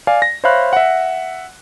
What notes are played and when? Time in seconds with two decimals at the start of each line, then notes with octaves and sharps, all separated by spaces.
0.07 D5 F5 G#5
0.22 A#6
0.44 C5 C#5 E5 F5 B5 F#6
0.73 E5 F#5